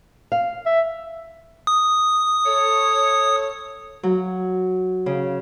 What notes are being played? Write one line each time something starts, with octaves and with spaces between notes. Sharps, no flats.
F5
E5
D#6
A4 C#5
F#3
C#3